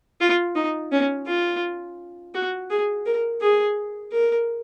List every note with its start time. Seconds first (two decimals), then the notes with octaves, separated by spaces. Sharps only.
0.21 F4
0.56 D#4
0.92 C#4
1.27 F4
2.35 F#4
2.70 G#4
3.06 A#4
3.41 G#4
4.13 A#4